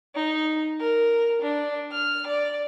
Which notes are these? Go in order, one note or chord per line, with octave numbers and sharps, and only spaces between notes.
D#4
A#4
D4
F6
D5